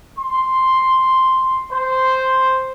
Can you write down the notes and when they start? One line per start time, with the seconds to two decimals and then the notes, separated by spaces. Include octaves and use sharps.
0.18 C6
1.71 C5